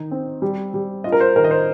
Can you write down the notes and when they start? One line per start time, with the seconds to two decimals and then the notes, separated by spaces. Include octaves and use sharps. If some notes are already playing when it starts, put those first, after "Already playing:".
Already playing: D#3 D#4
0.11 C4
0.42 G3
0.74 G3
1.04 F4 D#5
1.12 A#4
1.21 C5
1.36 D#3 A#4
1.44 D#5
1.51 C5